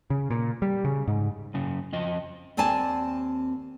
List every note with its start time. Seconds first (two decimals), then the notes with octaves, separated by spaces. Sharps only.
0.10 C#3
0.30 A#2
0.62 G3
0.84 C#3
1.08 G#2
1.54 F#2 C#3
1.93 F2 F3 D#5
2.57 D#2 C4 D5 G#5 A5